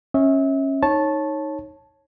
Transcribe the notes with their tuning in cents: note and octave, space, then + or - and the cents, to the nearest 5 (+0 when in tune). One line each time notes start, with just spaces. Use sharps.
C#4 -20 E5 -35
D#4 +0 C#5 -15 A5 -10